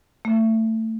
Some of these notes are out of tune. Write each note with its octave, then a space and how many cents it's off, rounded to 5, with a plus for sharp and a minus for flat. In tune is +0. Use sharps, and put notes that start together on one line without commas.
A3 +20